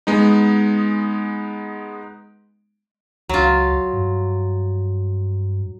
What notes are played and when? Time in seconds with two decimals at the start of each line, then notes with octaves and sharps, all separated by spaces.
0.07 G#3 B3 D#4
3.29 C#2 F#3 F4
3.93 G2